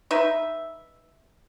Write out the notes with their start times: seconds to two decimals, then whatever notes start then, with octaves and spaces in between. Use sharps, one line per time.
0.11 D#4 B4 E5